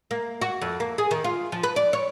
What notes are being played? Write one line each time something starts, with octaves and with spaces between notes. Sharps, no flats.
A#3
F#4
F2
A#3
G#4
D#3
F4
F3
B4
D5
C#5